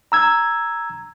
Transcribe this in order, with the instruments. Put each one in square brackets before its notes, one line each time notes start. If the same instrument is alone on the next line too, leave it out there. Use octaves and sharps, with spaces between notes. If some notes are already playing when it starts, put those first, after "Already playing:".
[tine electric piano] A#5 E6 G#6